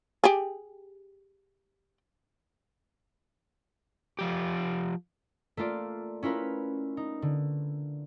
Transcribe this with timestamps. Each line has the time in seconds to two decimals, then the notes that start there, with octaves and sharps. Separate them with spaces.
0.24 G4 G#4
4.19 F3 G4
5.57 A3 A#3 F4 D5
6.23 C#4 E4 F4 A#4 B4
6.97 D#4
7.22 D3